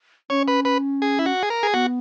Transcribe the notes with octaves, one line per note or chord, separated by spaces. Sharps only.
C#4 C#5
B4
B4
G#4
E4
F#4
G#4
A#4
G#4
B3 F#4